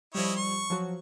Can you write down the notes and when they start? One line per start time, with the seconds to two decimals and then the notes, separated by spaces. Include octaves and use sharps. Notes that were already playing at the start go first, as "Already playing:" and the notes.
0.15 F3 G3 E4 C#5 D#5
0.37 C#6
0.70 F3 F#3 F#4